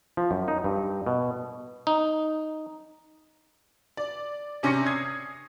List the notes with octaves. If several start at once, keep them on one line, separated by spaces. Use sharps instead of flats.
F3
F#2
D#4
G2
B2
D#4
D5
C3 C#4 D4 C#6 A#6 C#7
D#6 G#6 C7